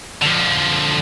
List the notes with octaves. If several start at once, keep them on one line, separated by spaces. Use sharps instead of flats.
D3 F3